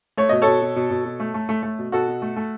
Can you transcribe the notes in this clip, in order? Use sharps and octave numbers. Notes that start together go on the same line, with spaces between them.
A3 C#5
B2 D#5
B2 A4 C#5
B2
B2
B2
B2
A3
A3
A3
A3
B2
B2 F#4 A4
B2
A3
A3